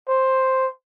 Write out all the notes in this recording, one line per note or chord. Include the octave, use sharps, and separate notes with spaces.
C5